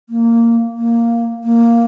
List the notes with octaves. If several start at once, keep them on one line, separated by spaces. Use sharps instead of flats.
A#3
A#3
A#3